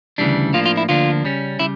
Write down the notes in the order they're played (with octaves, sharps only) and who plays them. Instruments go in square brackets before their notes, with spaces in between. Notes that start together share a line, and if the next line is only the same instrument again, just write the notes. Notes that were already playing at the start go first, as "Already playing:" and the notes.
[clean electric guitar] D2 C#3 E3 G3 D4
A2 F3 A#3 D4 F4
F4
E4
D2 D3 F3 A#3 D4 F4
C#3 G3 C#4
C#3 G3 E4